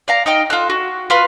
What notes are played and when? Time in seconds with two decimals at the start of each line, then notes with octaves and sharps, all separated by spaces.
0.08 D5 F5 A#5
0.26 D#4 D#5 G5 F6
0.50 F4 A4 F#6
0.70 F#4
1.10 F4 B4 F5